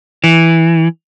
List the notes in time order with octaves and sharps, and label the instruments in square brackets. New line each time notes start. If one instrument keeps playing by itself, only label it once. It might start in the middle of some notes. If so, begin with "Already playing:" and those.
[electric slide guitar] E3